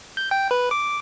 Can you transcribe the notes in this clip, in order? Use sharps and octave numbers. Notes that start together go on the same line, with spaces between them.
G6
G5
B4
D6